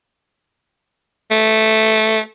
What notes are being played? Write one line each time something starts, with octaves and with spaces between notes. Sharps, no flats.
A3